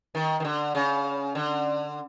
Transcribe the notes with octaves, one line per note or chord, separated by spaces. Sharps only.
D#3
D#3
D3
C#3
D3